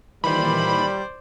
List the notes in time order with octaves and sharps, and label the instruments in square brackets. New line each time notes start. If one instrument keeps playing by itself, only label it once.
[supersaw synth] A#2 D#3 E3 [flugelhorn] G3 [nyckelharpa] C5 D5 [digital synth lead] B5